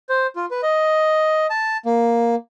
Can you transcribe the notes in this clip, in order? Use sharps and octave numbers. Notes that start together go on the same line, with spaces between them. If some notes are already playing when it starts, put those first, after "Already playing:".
C5
F4
B4
D#5
A5
A#3